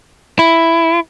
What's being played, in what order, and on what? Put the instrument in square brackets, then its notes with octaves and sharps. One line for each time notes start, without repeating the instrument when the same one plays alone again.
[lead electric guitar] E4